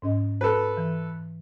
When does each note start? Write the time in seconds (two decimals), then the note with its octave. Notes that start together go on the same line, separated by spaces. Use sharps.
0.02 G#2 C#4 D#5
0.41 F#4 A4 B4
0.77 E3